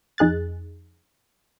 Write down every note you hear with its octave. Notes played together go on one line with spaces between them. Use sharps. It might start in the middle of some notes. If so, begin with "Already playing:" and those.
F2 D#4 G#4 F#6 A6